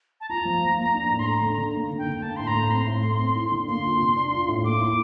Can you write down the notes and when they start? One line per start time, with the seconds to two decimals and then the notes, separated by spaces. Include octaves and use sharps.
0.21 A5
0.29 F4 A#5
0.45 F3
0.61 F3
0.78 A#3
0.94 D4
1.10 A2
1.19 C6
1.26 A3 A#5
1.42 D3
1.58 D3
1.74 A#3
1.91 D3
1.98 G5
2.06 D3
2.22 A#3 A5
2.37 A2 C6
2.47 A#5
2.55 A2
2.71 C4 C6
2.87 A2
3.03 A2
3.19 C4
3.35 E4
3.52 D3
3.68 A#3 C6
3.84 F4
3.99 C3
4.16 D4
4.32 F4
4.48 A2
4.64 A#3 D6
4.80 E4